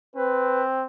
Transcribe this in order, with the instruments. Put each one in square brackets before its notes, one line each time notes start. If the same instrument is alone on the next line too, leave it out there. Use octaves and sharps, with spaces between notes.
[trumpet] C4 [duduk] B4